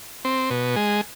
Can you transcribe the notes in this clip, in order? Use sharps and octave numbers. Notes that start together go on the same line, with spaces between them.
C4
B2
G#3